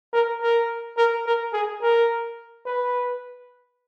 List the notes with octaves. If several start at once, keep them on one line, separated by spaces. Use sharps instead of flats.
A#4
A#4
A#4
A#4
G#4
A#4
B4